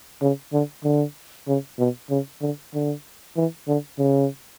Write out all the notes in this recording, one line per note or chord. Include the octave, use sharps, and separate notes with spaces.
C#3
D3
D3
C#3
B2
C#3
D3
D3
E3
D3
C#3